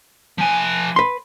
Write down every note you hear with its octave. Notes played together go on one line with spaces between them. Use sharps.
F3 G#5
B4 C6